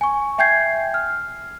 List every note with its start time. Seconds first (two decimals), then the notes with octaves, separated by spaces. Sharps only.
0.01 G#5 C#6
0.38 E5 G5 G#5 G6 G#6 C7
0.94 F6